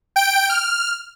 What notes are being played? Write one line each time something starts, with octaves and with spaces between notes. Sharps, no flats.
G5 D7
F6